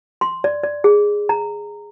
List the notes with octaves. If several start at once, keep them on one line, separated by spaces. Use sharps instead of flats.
C6
D5
D5
G#4
A#5